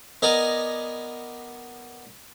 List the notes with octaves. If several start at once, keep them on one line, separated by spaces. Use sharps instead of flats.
B3 A#4 D5 D#5 G#5